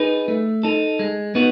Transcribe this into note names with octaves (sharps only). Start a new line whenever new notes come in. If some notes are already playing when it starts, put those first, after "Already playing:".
Already playing: D#4 G#4 B4
A3
D#4 A4
G#3
B3 D#4 F#4